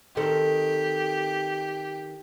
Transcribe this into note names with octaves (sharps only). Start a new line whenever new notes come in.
D#3 C4 G4 A4